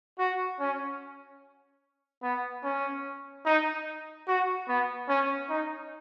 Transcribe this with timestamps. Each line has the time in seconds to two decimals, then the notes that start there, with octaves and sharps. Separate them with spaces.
0.19 F#4
0.60 C#4
2.23 B3
2.63 C#4
3.45 D#4
4.28 F#4
4.68 B3
5.08 C#4
5.50 D#4